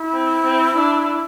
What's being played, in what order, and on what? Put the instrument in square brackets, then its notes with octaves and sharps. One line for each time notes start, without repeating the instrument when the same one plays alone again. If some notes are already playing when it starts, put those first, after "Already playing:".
Already playing: [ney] E4
[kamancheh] C4
C4
D4